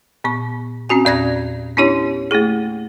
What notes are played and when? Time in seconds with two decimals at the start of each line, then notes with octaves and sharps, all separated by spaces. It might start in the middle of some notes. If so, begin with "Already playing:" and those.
0.24 A#2 B3 C#6
0.89 C4 C#4 F#4 G#5
1.05 E2 A#2 D5 F#6 G#6 A#6
1.77 B3 C#4 D4 E4 G4 C#5
2.31 A3 A#3 E4 G#4